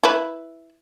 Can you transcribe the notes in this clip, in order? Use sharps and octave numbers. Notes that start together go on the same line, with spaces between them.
E4 B4